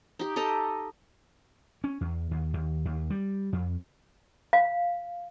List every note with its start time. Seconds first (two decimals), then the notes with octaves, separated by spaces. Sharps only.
0.19 D#4 G4
0.36 G4 A4 D#5 A#5
1.84 C#4
2.01 E2
2.31 D#2
2.54 D#2
2.85 D#2
3.10 G3
3.53 F2
4.53 F5